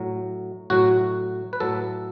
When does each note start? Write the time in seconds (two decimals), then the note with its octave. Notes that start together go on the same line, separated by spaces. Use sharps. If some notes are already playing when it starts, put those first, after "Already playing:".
Already playing: A2 F#3
0.70 A2 F#3 F#4
1.53 B4
1.60 A2 F#3 A4